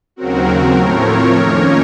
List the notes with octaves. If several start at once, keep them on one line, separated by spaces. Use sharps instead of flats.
D#2 C#3 F#3 C4 F#4 A#4
A2 F3 A3 C4 A#4 C#5
A#4 C#5
F2 D#3 A#3 C#4